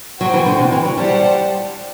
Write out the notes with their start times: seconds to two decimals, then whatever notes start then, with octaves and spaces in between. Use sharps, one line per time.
0.20 F#3 F#4 C5 G5
0.34 E3
0.46 D3
0.59 C3
0.72 E3
0.85 F#3
0.97 G3 G4 C5 F#5 A5